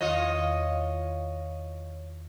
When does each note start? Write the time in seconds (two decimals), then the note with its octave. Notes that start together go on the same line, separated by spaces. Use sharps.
0.01 E2 D#3 F4 C#5 D#5